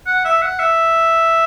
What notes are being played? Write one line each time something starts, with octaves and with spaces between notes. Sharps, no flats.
F#5
E5
F#5
E5